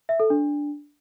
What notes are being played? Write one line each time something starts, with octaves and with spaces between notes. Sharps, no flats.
E5
A4
D4